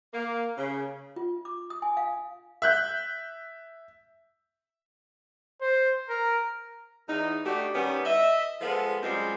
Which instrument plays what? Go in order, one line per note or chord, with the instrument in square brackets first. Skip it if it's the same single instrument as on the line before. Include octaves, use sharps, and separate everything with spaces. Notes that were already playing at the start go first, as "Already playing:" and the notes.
[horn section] A#3
C#3
[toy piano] F4
D6
D#6
G#5
F5
[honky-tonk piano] E5 F#6 G6
[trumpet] C5
A#4
[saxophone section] E2 D#4
A3 D4 D#4 F#4 G4
D#3 G3 B3 C#4
D#5 E5
F3 G#3 B3 F4 A4
F#2 G3 G#3 C4 F4